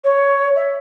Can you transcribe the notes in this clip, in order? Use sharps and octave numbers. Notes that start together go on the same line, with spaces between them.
C#5
E5